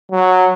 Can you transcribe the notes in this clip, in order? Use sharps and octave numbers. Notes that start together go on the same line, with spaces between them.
F#3